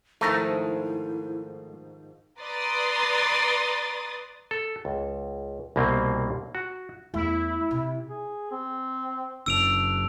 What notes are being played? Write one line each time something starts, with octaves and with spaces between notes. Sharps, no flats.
G#2 D#3 F3 A3 E4 A#5
B4 D5 A#5 C6 D#6 A6
A4
C#2
C2 B2 A#3 C4
F#4
E2 A3 E4
C3
G#4
C4
F#1 D4 E6 D7 F7